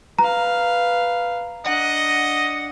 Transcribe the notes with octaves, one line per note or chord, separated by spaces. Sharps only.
B4 F5 A#5
D4 D#5 F#5